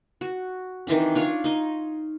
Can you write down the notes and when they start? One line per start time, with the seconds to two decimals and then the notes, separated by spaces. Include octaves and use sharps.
0.21 F#4
0.87 D#3 E3 C4 D4
1.15 D4 F4 C#5
1.44 D#4 D#5